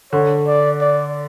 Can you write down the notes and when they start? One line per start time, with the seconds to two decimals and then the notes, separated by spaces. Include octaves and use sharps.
0.13 D3 C#5
0.47 D5
0.81 D5